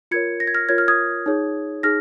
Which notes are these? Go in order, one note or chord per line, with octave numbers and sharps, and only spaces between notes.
F4 A#4 C#5 G#6 C#7
A#6
G#6
F6 A#6
F4 A#4 C#5 G#6
F6
D#6 G#6
D#4 G#4 C#5
D#4 G#4 F6 A#6